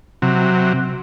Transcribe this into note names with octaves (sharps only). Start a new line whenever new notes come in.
C3 F#3